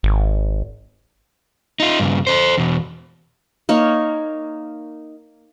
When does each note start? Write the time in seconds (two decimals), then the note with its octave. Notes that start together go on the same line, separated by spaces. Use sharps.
0.03 G#1
1.80 D#4 F4
2.00 G2 C#3
2.27 A4 C5
2.58 E2 B2
3.69 A#3 D#4 C#5